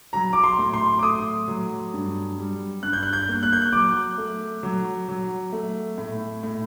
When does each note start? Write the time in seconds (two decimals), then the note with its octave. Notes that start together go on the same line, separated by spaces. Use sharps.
0.13 F#3 A#5
0.33 D6
0.44 C6
0.59 A2
0.74 C6
0.99 D6
1.03 A3 D#6
1.48 F#3
1.94 G2
2.38 G3
2.83 G2 F#6
2.93 G6
3.03 F#6
3.13 G6
3.29 A#3
3.43 F#6
3.53 G6
3.62 F#6
3.73 F#3 D6
4.18 A3
4.63 F#3
5.08 F#3
5.53 A3
5.98 A2
6.43 A2